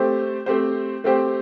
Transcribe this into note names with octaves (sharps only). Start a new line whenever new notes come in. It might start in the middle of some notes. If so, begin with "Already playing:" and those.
Already playing: A3 C4 G4 C5
A3 C4 G4 C5
A3 C4 G4 C5